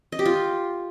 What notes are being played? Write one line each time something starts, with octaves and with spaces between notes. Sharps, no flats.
D#5
G4
F4